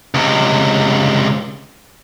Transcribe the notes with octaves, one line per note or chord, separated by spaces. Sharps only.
C#2 C3